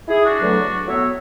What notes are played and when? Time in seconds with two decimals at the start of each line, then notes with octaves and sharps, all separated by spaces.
0.08 E4 G#4
0.24 D4 F#4
0.41 E2 D3 F#3 A3
0.87 A2 F#3 B3 C#5 E5